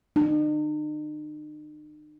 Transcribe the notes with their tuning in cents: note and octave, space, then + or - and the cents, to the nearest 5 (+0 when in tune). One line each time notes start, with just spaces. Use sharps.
D#4 -45